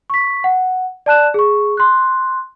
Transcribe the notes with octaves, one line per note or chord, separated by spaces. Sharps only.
C#6 B6
F#5
D5 A5 F#6 E7
G#4 C#6
C6 F#6